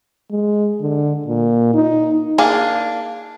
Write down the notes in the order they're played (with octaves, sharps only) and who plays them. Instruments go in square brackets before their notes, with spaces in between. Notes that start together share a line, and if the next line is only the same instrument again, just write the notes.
[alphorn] G#3
D3
A#2
D#4
[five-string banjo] A#3 D4 G#4 F5